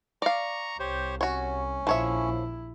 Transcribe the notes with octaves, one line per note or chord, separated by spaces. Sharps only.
D5 F5 A#5 C#6
C2 G4 C5 C#5
C#4 F#4 C#5
A#1 F3 E4 C#5 E5